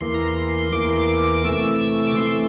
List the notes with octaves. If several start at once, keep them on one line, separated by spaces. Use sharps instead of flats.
E2 E3 A#3 C6
A#5
C6
E2 E3 A#3 D6
C6
D6
C3 E3 A3 E6
D6
C3 E3 A3 C6